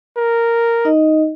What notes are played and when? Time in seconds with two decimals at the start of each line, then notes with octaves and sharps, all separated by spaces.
0.17 A#4
0.85 D#4 D#5